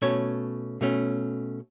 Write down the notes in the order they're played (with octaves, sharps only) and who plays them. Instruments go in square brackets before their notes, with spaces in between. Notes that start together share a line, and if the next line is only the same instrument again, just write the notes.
[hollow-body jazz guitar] B2 A3 C#4 C#5
B2 A3 C#4